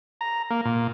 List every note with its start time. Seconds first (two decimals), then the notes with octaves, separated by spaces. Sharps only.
0.21 A#5
0.50 A#3
0.65 A#2